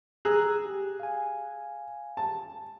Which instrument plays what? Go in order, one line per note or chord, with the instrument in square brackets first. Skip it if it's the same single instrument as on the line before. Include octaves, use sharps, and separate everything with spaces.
[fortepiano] G#4 [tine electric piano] A#5 E6 F#6
[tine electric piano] G4
F5 G#5
[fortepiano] A5